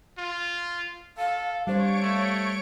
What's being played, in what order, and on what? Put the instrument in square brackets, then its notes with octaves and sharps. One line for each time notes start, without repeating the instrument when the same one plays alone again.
[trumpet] F4
[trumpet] A4 [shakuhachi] F5
[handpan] G3 C5 [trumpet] D4 [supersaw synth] C#5 C#6 D7 [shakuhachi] F5
[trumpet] A3